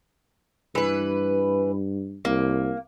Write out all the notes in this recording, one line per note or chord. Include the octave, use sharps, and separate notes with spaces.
G2 E3 B4
C2 A#3